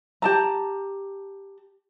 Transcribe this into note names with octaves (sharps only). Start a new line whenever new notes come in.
G4 A5 A#5